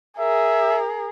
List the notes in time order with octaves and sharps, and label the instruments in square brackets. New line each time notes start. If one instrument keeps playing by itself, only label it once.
[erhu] G#4 [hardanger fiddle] A#4 [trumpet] E5